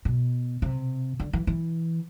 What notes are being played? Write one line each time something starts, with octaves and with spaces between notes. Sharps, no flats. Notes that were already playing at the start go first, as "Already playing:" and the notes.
B2
C3
D3
E3
E3